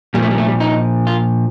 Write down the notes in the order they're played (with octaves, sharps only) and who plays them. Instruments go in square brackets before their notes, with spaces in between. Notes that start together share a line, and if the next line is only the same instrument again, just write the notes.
[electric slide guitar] A#2 G3
F3 A3
G3
A3
G3
D#4
F4